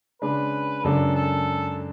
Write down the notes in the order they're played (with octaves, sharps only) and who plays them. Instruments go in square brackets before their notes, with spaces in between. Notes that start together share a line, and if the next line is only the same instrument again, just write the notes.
[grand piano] C#3 G#3 D4 [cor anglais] B4
[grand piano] F#2 C#3 G#3 D4 [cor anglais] A4
[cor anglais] A4